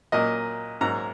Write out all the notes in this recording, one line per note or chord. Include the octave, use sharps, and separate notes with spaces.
A#2 F#3 A#3 D#5
G#2 F#3 A#3 A#5